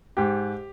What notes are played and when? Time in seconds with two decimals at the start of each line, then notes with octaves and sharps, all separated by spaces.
0.17 G#2 G4